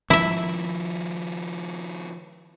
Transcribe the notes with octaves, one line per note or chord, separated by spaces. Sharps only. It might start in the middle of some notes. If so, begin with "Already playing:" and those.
D#3 F3 E4 E5